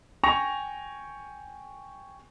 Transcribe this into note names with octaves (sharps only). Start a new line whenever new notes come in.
G5 G#5 C#6 A#6 F7